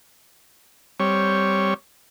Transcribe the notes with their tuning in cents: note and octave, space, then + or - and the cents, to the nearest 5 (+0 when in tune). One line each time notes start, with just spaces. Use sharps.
G3 +0 C4 +0 C#5 +0